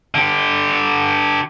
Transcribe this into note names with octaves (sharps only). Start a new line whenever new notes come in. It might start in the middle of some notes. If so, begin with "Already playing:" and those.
D3 G4